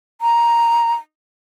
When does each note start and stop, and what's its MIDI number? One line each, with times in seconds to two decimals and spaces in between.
0.21 0.93 82